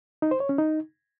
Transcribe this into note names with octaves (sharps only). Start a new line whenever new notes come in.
D#4
C5
C#5
C#4
D#4